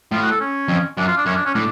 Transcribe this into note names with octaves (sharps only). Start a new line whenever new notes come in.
A2 F4
F#4
A4
C#4
F2
F#2 D4
F4
D4
F#2 C#4
D4
C#4
A2 D4